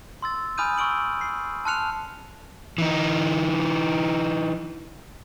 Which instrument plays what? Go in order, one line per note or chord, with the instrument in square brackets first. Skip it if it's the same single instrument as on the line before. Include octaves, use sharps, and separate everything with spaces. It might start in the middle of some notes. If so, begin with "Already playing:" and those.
[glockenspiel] C6 E6 A6
G#5 B5 D#6 F6 G6 D#7
C#6 E6 D7 F#7
C7
A5 C6 F6 F#6 C#7 F7
[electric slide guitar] E3 D#4